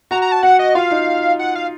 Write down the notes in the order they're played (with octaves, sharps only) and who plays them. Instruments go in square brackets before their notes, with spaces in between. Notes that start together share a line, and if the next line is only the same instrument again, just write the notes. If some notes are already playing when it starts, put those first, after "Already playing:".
[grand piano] F#4 [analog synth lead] A#5
[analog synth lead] A#5
A5
[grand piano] F#4 [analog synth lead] F#5
[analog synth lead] D#5
[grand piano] F4 [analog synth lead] F5
[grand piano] D#4
[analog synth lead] F#5
F5